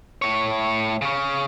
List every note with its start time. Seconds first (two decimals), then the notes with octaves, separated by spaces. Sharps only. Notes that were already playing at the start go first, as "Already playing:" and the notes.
0.22 A2 C#5
1.02 C#3 C#4